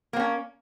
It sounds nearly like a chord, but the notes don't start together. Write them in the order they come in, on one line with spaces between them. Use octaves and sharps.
A#3 C4 C#4